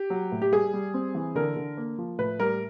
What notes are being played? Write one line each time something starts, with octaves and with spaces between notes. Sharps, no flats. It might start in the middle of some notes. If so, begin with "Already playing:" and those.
Already playing: G4
F#3
A2
G4
G3 G#4
G3
C4
E3
D3 A#4
D3
A#3
F3
A2 B4
G3 A#4